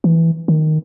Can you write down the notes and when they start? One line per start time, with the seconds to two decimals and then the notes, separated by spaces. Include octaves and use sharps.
0.04 E3
0.48 D#3